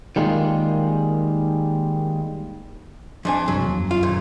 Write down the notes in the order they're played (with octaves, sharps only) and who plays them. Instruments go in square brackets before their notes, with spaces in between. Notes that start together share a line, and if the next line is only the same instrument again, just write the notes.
[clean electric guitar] D#3 G3 G#3 A#3 F4
[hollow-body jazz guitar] F2 D4 G#5
[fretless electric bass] C2 G2 [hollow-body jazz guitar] F3 F#3
[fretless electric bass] E2 A#3
F#2
[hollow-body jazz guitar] F4
D#2 A#2